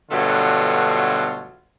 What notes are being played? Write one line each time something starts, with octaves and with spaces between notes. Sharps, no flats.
G2 B2 D3 F#3 A3 F4